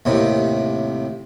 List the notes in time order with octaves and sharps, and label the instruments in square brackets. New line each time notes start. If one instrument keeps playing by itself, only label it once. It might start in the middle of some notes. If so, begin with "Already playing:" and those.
[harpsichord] D#2 A2 C3